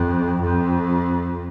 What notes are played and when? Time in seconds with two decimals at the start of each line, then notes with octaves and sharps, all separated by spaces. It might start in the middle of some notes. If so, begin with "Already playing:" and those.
Already playing: F2
0.43 F2